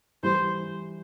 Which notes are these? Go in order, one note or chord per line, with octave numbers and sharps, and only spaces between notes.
E3 G3 C5